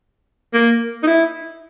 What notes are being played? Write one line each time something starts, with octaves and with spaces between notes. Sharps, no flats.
A#3
D#4
E4